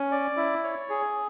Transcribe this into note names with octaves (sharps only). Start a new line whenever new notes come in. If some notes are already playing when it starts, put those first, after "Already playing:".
Already playing: C#4
D5
E4
C#5
G#4